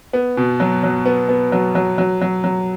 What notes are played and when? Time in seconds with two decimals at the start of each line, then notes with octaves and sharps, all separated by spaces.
0.13 B3
0.37 B2
0.60 F#3
0.83 F#3
1.06 B3
1.29 B3
1.52 F#3
1.75 F#3
1.98 F#3
2.21 F#3
2.44 F#3